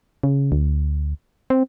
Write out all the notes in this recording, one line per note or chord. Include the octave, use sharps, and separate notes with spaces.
C#3
D2
C4